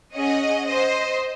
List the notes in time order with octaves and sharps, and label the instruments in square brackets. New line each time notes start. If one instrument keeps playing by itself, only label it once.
[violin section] C#4 G#4 D#5 F#5
C5 D#5